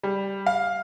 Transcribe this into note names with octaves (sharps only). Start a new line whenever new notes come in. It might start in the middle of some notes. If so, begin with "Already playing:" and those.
G3
F5